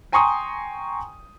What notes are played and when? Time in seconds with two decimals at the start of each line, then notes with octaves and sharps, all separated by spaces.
0.12 G5 G#5 A#5 C6 C#6 D#6